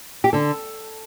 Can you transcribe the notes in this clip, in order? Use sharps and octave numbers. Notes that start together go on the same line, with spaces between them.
G4
D3 A4